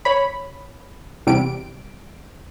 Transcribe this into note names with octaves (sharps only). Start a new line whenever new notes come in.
C#5 B5
E2 C3 G3 D7